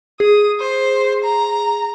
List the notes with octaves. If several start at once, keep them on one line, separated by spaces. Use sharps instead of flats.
G#4 D#6
C5
A#5